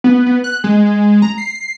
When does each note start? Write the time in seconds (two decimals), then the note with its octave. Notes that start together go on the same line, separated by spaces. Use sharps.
0.04 B3
0.26 B3
0.44 F#6
0.64 G#3
1.22 A#5
1.38 C7